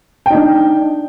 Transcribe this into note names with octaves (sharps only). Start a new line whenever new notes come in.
D4 D#4 G5